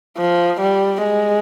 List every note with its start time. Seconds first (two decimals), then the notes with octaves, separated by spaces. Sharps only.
0.17 F3
0.60 G3
1.03 G#3